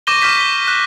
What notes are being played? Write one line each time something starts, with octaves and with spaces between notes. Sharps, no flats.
C#6 D6 G6 A#6 D#7 G7
C#6 F6 G6 B6 D#7
B6 G7
F#6